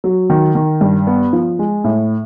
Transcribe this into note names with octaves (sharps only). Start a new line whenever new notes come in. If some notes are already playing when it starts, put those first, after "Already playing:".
F#3
D#3
D#3
G2
B3
F3
G#3
A2